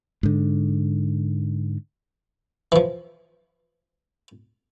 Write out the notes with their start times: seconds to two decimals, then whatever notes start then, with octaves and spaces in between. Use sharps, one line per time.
0.23 G#2 D3
2.72 E3 F3